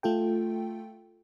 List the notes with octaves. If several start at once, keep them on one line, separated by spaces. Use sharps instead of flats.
A3 F4 A4 G5